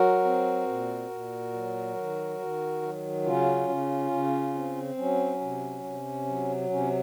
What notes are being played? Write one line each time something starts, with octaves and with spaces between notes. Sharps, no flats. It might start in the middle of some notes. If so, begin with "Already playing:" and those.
Already playing: F#3 F#4 A#4
C4
A#2
A#2
F#3
D#3
D#3
F#3
C#3 C#4 F4
C#3
C#3
C4
F#3 C#4
C3
C3
F#3
C3 C#4